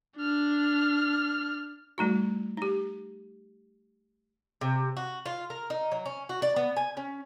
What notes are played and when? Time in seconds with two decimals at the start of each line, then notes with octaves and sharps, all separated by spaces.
0.17 D4 F6
1.98 G3 A3 D#4 F#4
2.57 D#4 G4
4.61 C3
4.97 F#4
5.26 F4
5.50 A#4
5.70 D#4
5.92 F#3
6.06 C#4
6.29 F#4
6.42 D5
6.56 B3
6.77 G#5
6.97 C#4